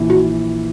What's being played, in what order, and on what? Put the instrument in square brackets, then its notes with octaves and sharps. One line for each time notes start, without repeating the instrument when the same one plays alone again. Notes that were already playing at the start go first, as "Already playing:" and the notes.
Already playing: [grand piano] A#1 E3
[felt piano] F#4